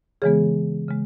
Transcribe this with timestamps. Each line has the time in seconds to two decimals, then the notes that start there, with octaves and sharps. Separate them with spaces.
0.22 C#3 E3 G#3 B3 G#4 C#5
0.88 C#3 G#3